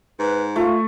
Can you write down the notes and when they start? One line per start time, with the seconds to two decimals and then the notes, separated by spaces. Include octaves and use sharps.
0.20 G#2 B4
0.56 A3 F4